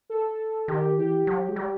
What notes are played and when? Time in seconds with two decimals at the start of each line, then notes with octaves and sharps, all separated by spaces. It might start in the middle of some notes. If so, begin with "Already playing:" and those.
0.10 A4
0.68 D#3 G4
0.97 E3 G4
1.27 F#3
1.48 G#3
1.56 G3